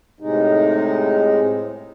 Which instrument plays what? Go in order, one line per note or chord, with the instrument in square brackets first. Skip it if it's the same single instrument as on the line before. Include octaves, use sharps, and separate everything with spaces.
[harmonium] A2 C3 G#3 D#4